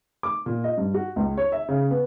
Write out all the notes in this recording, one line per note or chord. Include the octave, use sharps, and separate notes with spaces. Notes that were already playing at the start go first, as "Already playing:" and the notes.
D6
A#2
D#5
G2
F#4
C#2
C#5
E5
C#3
B3